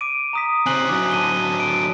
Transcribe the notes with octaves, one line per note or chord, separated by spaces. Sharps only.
D6 D7 D#7
A#5 D#6 B6
C#3 C4 G#5 F#6 F#7
D3 F#3 D6
A5 D#7 G7
D7